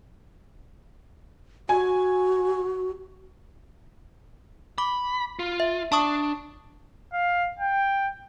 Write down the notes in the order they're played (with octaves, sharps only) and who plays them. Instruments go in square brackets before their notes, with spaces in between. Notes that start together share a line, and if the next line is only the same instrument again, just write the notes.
[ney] F#4 [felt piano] G#5
[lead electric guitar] B5 [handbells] D6
[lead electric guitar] F4
[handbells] E5
[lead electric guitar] D4 [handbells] A5 C#6 D#6
[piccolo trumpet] F5
G5